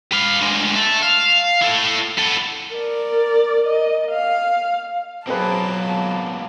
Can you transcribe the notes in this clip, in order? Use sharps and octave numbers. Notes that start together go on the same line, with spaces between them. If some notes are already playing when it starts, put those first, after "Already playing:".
B4 F5
D2 G#3
E5 A5
F5
E4 A4
B3 A4
A#4 D5
D#5
F5
B2 F#3 A#3 C4 G#4 B4 A5